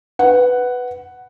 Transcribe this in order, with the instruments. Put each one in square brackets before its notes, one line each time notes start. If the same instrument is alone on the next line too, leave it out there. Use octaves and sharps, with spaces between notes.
[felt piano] B4 F#5